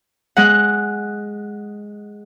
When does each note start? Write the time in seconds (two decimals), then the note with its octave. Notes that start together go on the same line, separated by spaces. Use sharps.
0.37 G#3 F#5